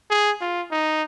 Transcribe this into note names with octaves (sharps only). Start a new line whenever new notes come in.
G#4
F4
D#4